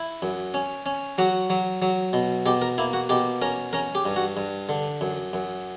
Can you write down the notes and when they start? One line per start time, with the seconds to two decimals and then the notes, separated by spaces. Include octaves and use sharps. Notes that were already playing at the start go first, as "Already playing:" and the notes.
Already playing: E4
0.22 F#2
0.54 C#4
0.86 C#4
1.18 F#3 F#4
1.50 F#3
1.82 F#3
2.13 B2
2.46 B2 G4
2.62 A#4
2.78 A#3 E4
2.93 F#4
3.09 B2 G4
3.42 C#4 A#4
3.73 C#4 A#4
3.95 G4
4.06 G2
4.16 F#4
4.37 G2
4.69 D3
5.01 F#2
5.33 F#2